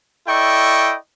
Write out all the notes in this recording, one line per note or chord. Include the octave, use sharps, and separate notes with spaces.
E4 A4 D5 D#5 G5 C#6